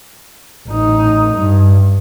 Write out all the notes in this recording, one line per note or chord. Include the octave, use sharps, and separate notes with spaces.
A1 D#4
G2